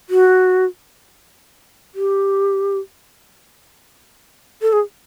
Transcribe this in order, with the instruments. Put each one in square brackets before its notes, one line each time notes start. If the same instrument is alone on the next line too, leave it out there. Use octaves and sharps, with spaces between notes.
[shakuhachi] F#4
G4
A4
G#4